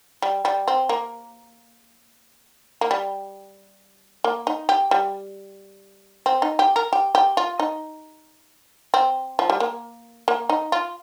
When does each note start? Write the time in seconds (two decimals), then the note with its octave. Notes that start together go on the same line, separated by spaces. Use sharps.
0.22 G3
0.45 G3
0.68 C4
0.89 A#3
2.81 A#3
2.91 G3
4.24 A#3
4.47 D#4
4.69 G4
4.91 G3
6.26 C4
6.42 D#4
6.59 G4
6.76 A#4
6.93 G4
7.15 G4
7.37 F4
7.60 D#4
8.94 C4
9.39 F3
9.50 G3
9.60 A#3
10.28 A#3
10.49 D#4
10.72 F4